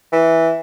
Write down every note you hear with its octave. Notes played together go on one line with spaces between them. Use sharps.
E3